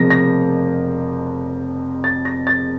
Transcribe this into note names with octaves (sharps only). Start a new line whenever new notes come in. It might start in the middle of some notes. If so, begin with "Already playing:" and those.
Already playing: F1 F2 C#3 F3 A#3 A#6
A#6
A6
A#6
A6